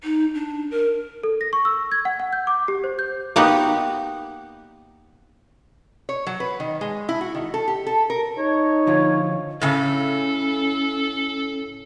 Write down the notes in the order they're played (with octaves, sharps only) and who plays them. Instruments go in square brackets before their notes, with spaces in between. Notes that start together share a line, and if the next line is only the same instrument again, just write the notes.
[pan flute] D#4
D4
A#4
[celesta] A4
A#6
C#6
E6
G#6
F#5
F#5
G6
D6
G4
C5
G6
[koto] A#3 B3 D#4 F#4 G4
[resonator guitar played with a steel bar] C#5
F#3
B4
D#3
G#3
E4
F#4
D#3
A4
G4
A4
A#4
[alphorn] D#4 [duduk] C#5
[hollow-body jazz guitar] D3 F3 F4
[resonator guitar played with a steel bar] A2 C#3 [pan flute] C#4 [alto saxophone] A4